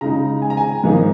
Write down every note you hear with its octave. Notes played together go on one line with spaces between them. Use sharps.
C#3 G#3 D#4 A#5
G#5
A#5
G#5
G#2 F3 A#3 D#4